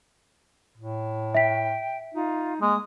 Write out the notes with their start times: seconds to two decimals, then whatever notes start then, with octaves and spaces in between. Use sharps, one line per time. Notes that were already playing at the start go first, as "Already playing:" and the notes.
0.78 A2
1.35 E5 G5 B6
2.14 D#4 F4
2.61 G#3 A#3 D#6